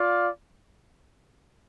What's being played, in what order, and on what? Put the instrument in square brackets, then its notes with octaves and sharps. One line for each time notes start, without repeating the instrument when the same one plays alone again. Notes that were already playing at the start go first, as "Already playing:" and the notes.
Already playing: [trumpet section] F4 D5 F5